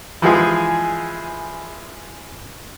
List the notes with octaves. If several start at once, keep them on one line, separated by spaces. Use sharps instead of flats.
E3 F3 G#3 G#4